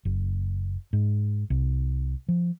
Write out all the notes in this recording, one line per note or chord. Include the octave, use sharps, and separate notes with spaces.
F#1
G#2
C2
F3